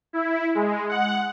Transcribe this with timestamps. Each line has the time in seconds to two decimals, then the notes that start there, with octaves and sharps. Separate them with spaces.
0.13 E4
0.55 G#3
0.89 F#5